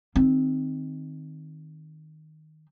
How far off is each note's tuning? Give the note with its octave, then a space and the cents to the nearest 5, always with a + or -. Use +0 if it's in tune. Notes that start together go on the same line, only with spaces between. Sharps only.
D#3 +0 C4 +0